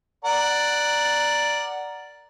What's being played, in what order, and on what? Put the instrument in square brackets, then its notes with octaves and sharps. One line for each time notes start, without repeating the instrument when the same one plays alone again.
[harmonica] A#4 D5 F#5